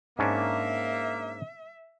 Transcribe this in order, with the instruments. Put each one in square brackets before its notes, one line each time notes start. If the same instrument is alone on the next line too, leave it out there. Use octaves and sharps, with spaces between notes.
[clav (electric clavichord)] G#2 C#4 D4 [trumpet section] A#3 [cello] E5